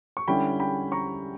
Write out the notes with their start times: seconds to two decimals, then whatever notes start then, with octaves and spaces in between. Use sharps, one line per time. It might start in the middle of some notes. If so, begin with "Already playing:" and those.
0.17 C#6
0.27 D3 G3 C#4 E4 G5 B5
0.60 G5 B5
0.92 A#5 C#6